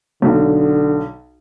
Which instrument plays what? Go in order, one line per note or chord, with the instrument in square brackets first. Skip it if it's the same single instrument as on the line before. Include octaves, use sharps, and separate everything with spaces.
[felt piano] B1 [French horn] D3